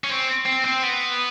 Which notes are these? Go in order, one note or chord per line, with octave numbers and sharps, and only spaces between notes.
C#4
C4
C4
C4
B3